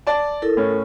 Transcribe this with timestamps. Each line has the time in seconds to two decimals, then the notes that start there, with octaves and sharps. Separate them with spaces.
0.07 D5 A5
0.42 E4 A4 A#4
0.57 A2 C#4